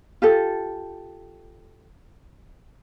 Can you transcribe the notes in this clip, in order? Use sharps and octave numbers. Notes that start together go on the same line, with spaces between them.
F4 G4 A4